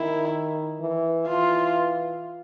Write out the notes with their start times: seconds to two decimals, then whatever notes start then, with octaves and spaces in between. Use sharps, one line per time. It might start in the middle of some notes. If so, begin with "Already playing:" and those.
Already playing: D#3 E4
0.81 E3
1.28 E3 F4